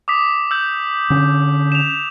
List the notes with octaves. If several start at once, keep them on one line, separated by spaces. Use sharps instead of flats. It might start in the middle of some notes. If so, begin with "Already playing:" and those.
D6 D#6 B6
E6 G6
D3 C#4
E7 F7